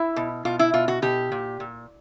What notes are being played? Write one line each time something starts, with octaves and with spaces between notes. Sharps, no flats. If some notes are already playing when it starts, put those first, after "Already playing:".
Already playing: E4
B2
B2 F4
E4
B2 F4
F#4
B2 G4
A#2
A#2